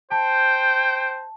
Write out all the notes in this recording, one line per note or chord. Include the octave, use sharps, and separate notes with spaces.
C5 G5 A5